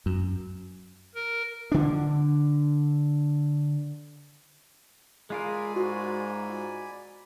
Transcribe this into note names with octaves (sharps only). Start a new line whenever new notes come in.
F#2
A#4
D3 D4
G#3 F4 G#4 A#4 D5 G#5 B5
G#2 F#4